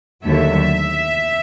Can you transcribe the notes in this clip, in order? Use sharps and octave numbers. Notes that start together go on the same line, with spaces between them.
D#2 D3 F#3 A3 E5